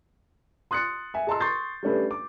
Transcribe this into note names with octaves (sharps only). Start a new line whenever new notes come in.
C6 D#6 F#6 A6 C#7
E5 G#5
G#4 D#5 A5 A#5 C6 E6
C6 C#6 D#6 G6 A6 C7
G3 A3 C#4 D4 A4 B4
D6